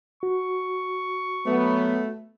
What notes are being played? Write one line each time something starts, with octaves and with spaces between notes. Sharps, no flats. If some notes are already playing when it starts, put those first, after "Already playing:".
F#4 C#6
F#3 A3 B3